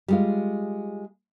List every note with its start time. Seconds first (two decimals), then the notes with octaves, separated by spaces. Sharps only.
0.08 G3 G#3 F4